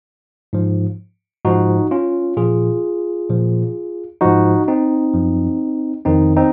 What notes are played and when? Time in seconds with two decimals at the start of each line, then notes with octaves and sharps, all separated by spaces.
0.53 G#2 F3
1.45 G#2 F3 D#4 F#4
1.91 C#4 F4
2.37 A#2 F3 F4 G#4
3.30 A#2 F3
4.21 G#2 F3 D#4 F#4
4.68 C4 D#4
5.14 F#2 F3
6.05 F2 D#3 C4 D#4
6.36 C4 D#4